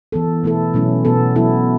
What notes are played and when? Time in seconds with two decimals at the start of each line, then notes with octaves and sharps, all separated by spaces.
0.12 E3 B3 A4
0.43 B2 A3 E4 A4
0.74 B2 F#3 A3 C#4 E4
1.05 B2 B3 A4
1.36 F#3 B3 E4 A4